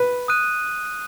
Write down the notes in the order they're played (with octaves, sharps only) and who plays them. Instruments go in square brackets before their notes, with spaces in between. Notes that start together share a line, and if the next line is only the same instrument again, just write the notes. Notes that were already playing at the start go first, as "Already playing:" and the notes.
Already playing: [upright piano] B4
[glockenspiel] D#6 F#6 D#7